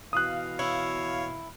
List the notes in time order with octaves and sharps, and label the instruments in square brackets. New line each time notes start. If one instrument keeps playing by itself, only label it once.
[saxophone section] B2 E3 F5 [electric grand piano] D#6 F#6
[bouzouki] E4 [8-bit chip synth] C#5